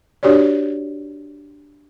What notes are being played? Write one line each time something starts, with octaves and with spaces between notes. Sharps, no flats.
D4 F#4 G4 C#5 D5